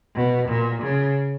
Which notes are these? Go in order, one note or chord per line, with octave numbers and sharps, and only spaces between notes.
B2
A#2
C#3